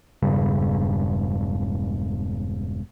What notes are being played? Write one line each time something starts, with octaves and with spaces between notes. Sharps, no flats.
E1 G2 C#3 G3